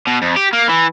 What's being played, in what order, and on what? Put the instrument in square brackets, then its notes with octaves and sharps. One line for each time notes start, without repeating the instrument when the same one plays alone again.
[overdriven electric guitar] B2
F2
G4
A#3
E3